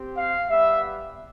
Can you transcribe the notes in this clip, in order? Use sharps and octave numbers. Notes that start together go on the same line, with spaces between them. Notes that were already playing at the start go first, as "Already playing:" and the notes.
Already playing: C4 G4
F5
G3 B3 E5